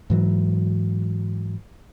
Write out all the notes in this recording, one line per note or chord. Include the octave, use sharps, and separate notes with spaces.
G#2 E3 F#3